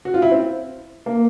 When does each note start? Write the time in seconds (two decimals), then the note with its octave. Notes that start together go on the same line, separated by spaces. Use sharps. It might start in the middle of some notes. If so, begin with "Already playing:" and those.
0.05 F#4
0.14 F4
0.22 E4
0.31 C4
1.06 A#3